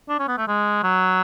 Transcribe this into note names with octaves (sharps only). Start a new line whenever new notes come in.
D4
C#4
B3
A3
G#3
F#3